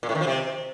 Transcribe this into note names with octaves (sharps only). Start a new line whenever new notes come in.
A#2
A2
D#3
F3
C3